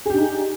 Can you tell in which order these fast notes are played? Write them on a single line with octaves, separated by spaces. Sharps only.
G#4 G4 D4 D#4